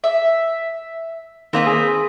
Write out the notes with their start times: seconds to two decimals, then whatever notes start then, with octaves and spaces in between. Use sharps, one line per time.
0.04 E5
1.53 D#3 A#3 C4 D#4 B4
1.67 G#4